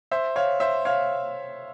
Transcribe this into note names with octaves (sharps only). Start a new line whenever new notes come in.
C5 E5
C#5 F5
C5 E5
C#5 F5